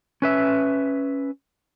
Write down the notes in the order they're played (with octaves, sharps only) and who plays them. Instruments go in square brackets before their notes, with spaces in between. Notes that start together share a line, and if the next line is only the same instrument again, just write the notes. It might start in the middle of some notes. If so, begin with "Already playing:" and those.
[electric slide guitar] C#4 B4 E5